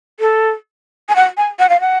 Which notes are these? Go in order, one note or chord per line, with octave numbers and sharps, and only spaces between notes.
A4
G#5
F#5
G#5
F#5
F5
F#5